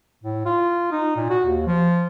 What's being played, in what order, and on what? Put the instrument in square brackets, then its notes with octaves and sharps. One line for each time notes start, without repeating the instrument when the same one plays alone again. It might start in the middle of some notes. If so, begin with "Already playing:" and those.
[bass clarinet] A2
F4
D#4
A#2
F#4
D#2
F3